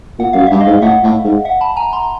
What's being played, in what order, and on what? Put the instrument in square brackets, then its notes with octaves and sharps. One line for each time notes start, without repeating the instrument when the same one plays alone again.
[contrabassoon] A#2 [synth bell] F#5
[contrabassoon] F#2 [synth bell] F5
[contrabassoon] G2 [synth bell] E5
[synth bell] D#5 F5
[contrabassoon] G#2
[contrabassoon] A2 [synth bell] E5 F#5
[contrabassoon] A2
G#2
[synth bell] E5 F#5
A5 B5
G#5 A#5
A#5 C6